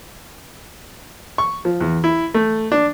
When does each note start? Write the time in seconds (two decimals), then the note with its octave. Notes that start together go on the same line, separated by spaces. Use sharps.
1.38 C#6
1.65 F3
1.81 E2
2.04 E4
2.34 A3
2.72 D4